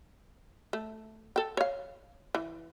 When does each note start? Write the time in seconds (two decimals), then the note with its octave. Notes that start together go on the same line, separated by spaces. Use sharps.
0.73 A3
1.36 A4 G5
1.57 C#5 F5
2.35 E3